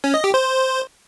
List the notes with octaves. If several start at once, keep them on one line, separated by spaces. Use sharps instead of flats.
C#4
D#5
G4
C5